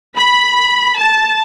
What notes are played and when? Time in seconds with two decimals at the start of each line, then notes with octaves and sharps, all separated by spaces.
0.18 B5
0.98 A5